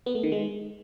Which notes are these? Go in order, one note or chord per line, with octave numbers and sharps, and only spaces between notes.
B3
A3
D#3
G#3